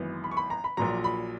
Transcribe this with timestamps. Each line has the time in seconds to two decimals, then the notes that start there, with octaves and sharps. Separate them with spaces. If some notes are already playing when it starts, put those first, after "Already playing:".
Already playing: G#1 F#2 E3 B3
0.24 B5
0.31 C#6
0.37 B5
0.50 A#5
0.64 B5
0.77 A#1 A#2 F#3 A#5
1.04 B5